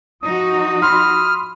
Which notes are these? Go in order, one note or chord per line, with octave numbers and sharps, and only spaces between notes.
F3 D#4 F#4 D#6
B5 C6 F6